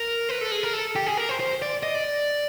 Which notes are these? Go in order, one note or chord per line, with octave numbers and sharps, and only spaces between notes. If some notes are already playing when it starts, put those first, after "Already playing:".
Already playing: A#4
B4
A4
G#4
A#4
A4
G4
G#4
A#4
C5
C5
D5
D#5
D5